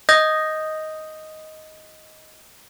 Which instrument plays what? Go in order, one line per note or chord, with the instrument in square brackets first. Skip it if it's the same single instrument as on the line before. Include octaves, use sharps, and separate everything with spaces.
[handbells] D#5 D#6 G6 A#6